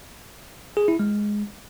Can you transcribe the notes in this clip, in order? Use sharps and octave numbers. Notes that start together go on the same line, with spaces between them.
G#4
E4
G#3